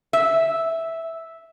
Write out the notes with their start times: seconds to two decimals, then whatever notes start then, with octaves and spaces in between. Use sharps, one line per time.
0.13 E5